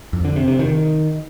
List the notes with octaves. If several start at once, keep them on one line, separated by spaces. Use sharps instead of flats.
F2
D3
C3
C3
D#3